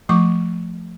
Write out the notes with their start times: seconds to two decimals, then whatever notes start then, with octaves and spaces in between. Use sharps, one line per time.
0.09 F3 A3 C#6 D6